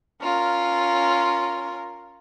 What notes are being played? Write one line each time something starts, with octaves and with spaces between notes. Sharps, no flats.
C#4 F4 A#4